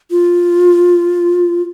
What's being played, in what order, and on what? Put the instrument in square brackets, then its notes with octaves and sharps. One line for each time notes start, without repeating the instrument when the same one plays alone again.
[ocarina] F4